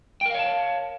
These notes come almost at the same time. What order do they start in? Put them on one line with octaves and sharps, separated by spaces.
G5 A#4 F5 C#5 A5